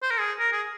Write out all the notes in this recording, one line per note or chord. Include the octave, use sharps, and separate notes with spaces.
C5
A#4
G#4
A#4
G#4